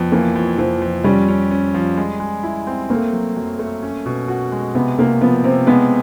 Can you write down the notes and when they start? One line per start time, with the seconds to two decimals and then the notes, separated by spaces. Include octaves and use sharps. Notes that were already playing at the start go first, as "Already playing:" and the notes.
Already playing: F2 B3
0.12 E3 A#3
0.36 F2
0.58 F2 F3
0.82 F2
1.04 G3 C#4
1.28 C#4
1.51 C#4
1.74 F3
1.97 G#3
2.20 G#3
2.43 E4
2.67 C4
2.90 A3 A#3
3.13 F#3
3.37 F#2
3.59 A3
3.83 C#4
4.06 B2
4.28 F#4
4.52 G#3
4.75 C3 B3
4.98 C3 A#3
5.21 F3 B3
5.44 C3 C4
5.67 G#3 B3